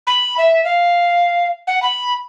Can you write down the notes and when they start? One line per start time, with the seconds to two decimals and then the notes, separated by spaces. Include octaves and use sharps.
0.07 B5
0.38 E5
0.65 F5
1.67 F#5
1.83 B5